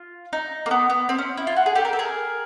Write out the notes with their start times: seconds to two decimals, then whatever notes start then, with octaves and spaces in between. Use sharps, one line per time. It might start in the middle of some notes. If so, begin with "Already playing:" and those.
Already playing: F4
0.33 D#4
0.66 A#3
0.71 B3
0.90 B3
1.09 C4
1.18 C#4
1.37 E4
1.47 F4
1.56 F#4
1.66 G#4
1.75 G4 A4
1.85 A#4
1.93 A4
1.99 G#4 A#4